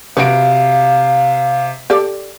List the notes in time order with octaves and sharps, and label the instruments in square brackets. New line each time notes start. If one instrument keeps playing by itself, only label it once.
[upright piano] C3 D7 [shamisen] F#3 F#4 B4 [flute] F5
[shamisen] G4 A4 D5